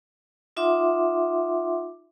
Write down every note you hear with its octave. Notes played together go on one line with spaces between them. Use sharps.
D#4 F4 E5 F#5 C6 D6